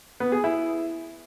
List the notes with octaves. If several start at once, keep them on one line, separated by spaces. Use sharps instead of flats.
B3
G#4
E4